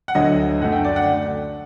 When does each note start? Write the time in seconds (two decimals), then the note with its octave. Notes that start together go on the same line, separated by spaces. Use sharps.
0.08 F#5
0.15 D2 D3 F#3 D#5
0.60 F#2 D3 A3 F#5
0.72 G5
0.84 D5
0.96 F#5